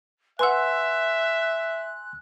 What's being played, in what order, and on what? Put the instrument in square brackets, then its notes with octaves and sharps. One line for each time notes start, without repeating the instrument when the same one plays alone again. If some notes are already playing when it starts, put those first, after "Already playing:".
[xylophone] B4 F#5 [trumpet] E5 [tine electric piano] G#5 C6 E6 [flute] F#6